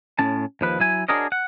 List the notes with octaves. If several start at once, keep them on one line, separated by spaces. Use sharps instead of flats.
A2 C#4 A5
D#2 F3 B4
F#3 E4 G#5
D4 F#4 G#4 A#4 C#5 D#5
F#5